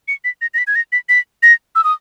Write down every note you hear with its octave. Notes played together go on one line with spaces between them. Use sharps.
C#7
B6
A#6
A#6
B6
G#6
A#6
B6
B6
A#6
E6
D#6